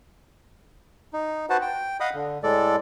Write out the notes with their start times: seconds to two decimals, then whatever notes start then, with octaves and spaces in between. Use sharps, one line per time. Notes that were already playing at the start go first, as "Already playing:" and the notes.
1.13 D#4
1.50 F#4 B4 C5 F#5 A5
1.62 G5
2.00 D#5 F5 F#5 B5 D#6
2.14 D3
2.43 A2 G#3 A4 D5